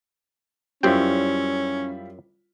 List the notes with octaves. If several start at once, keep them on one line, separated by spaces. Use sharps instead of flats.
F#2 G3 C#4 E4 F4 C5 G5